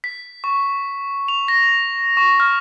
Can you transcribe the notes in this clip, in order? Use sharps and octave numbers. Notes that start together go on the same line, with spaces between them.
B6
C#6
F7
A#6
C#6
F6